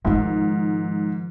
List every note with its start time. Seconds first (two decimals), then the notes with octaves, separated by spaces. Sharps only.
0.05 G#2 D#3 F3